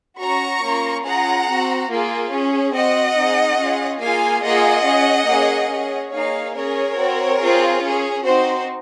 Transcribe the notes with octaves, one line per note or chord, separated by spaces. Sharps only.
C#4 F#4 A#5 C#6
A#3 C#4 F4
C#4 F4 G#4 F#5 A#5
C4 F#4
A#3 F4 G#4
C#4 G#4
C4 F#4 D#5 F#5
C4 D#4 G#4
C#4 F4 G#4
A#3 F4 G#4 F5 G#5
A#3 F4 G#4 D#5 F#5
C#4 G#4
A#3 C#4 G#4
C#4 G#4
A#3 D#4 G#4 C#5 F5
C#4 G#4 A#4 C#5
C4 F#4
C4 F4 G#4
C#4 G#4
C4 D#4 F#4 C5